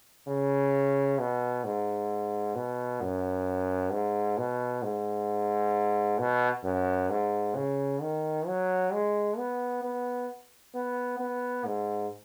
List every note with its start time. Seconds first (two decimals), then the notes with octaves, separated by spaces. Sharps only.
0.28 C#3
1.19 B2
1.65 G#2
2.55 B2
3.02 F#2
3.92 G#2
4.38 B2
4.83 G#2
6.19 B2
6.64 F#2
7.10 G#2
7.55 C#3
8.02 D#3
8.47 F#3
8.93 G#3
9.38 B3
9.83 B3
10.75 B3
11.20 B3
11.66 G#2